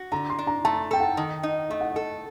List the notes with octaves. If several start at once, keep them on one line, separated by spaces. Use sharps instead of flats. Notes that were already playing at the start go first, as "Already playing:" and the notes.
Already playing: F#4
D3 A#5
C6
D4
A#5
A3 A5
A4 G5
F#5
D#3
D#4
A3 D#5
F#5
A4 D#5